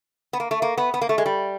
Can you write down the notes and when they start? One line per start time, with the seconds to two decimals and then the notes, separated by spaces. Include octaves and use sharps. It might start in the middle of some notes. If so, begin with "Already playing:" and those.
0.33 B3
0.40 A#3
0.51 A3
0.62 A#3
0.78 B3
0.94 B3
1.01 A#3
1.09 A3
1.18 G#3
1.26 G3